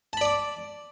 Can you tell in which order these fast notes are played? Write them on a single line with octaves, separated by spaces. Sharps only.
A5 B5 D5 D6